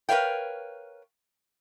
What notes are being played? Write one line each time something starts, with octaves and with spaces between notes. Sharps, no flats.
A#4 B4 C#5 F5 G5